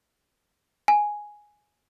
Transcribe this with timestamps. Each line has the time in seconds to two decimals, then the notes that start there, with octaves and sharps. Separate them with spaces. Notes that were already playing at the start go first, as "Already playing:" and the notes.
0.88 G#5